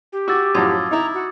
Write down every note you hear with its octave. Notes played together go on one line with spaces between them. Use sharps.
G4
F#4 D6 E6 A6
F#2 A2 F3 D#6 G#6 A6
D#4 E4 A#5
F#4